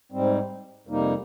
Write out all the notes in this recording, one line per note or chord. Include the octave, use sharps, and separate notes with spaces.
G#2 G3 C4
F2 C3 G3 A#3 D#4